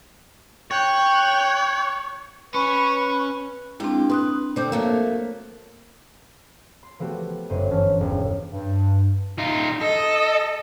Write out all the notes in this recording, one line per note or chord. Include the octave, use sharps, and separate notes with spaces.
C#5 G5 F#6
C#4 B4 B5 C#6
G#3 A#3 C4 D4 E4 G4
B4 C6 D#6 F#6
D3 C4 C5 D6 G6
F#3 A3 A#3
C6
F3 A3 B3 F#4 G4
G1 F#2 C5 D#7
E3 C#4 A5 F6
E1
G2
D#4 F4
A4 D#5